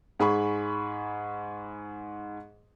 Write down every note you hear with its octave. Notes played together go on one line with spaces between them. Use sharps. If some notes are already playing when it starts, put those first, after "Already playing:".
G#2 G#4 B5 C#6